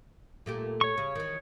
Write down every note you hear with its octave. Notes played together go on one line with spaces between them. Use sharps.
A#2 A3 G4
C#5 C#6
C#3
D#3 E3